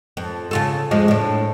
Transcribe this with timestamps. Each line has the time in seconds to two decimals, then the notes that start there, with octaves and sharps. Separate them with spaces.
0.17 F2
0.51 C#3 F4 A4
0.91 F2 F3 G#3
1.08 A2 D4